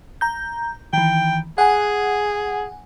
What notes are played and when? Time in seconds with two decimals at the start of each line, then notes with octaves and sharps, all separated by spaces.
0.21 A#5 G6
0.93 D#3 E3 G5
1.58 G#4 F#5 G#5